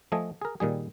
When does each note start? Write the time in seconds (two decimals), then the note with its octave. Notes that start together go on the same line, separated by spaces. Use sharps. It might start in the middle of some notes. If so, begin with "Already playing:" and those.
0.12 F3 A3 D#5 G#5
0.42 G#4 A#4
0.60 A#2 D#3 G3 G#4